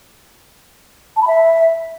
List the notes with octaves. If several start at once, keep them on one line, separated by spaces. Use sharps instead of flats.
A5
B5
E5